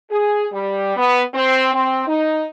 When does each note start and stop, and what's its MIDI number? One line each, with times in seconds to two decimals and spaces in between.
0.10 0.45 68
0.51 0.95 55
0.97 1.21 59
1.34 1.72 60
1.73 2.03 60
2.07 2.46 63